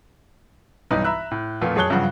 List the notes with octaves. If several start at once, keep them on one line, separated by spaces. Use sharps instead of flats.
B1 G2 E3 D#4 B4
E5 A#5 B5 E6 F#6
A2
F2 A#2 A3 B3 F4
F#2 G#4 C#5 A5 F#6 G7
G2 C#3 F3 F#3 F#4